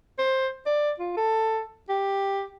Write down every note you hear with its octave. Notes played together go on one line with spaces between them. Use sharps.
C5
D5
F4
A4
G4